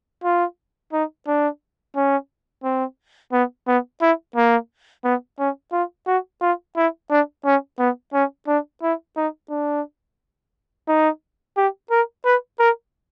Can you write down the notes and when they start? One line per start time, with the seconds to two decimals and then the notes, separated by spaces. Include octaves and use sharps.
0.24 F4
0.93 D#4
1.27 D4
1.96 C#4
2.64 C4
3.33 B3
3.67 B3
4.02 E4
4.36 A#3
5.04 B3
5.39 C#4
5.72 F4
6.07 F#4
6.41 F4
6.77 E4
7.10 D4
7.45 C#4
7.79 B3
8.14 C#4
8.47 D4
8.83 E4
9.17 D#4
9.50 D4
10.88 D#4
11.57 G4
11.91 A#4
12.26 B4
12.59 A#4